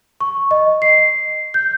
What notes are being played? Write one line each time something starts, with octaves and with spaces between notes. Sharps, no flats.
C#6
D#5
C7
G6